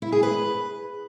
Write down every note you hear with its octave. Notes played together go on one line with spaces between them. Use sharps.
E4
G#4
B4